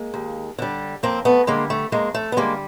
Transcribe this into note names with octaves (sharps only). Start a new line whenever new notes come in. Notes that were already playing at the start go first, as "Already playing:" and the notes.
Already playing: G#3 A#3
D#2
D3 G3
F2 A#3 C4
A3 B3
D3 G3 G#3 A#3
A3
F2 G#3 A#3
A3
B3
D3 G3 G#3 A#3